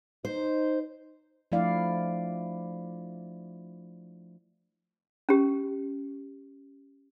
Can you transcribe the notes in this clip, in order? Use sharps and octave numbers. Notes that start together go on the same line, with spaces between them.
D#4 C5
F3 A3 D4 E4 D5 F5
C#4 G4